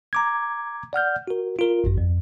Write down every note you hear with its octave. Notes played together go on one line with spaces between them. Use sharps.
A#5 D6 G#6
D5 F#5 F6 G6
F#4 A#4
F4 A#4
G#1 F#2
F2